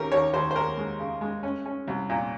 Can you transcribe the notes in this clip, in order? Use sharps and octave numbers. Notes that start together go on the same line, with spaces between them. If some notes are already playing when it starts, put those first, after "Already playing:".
Already playing: D#2 C#4 G4 A#4
D#2 C#5
D#2 C5
C5
D#2 A#4
G#3
C#3
G#3
C#4
C#4
C2
A#2